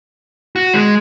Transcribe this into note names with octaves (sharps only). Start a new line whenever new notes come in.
F#4
G#3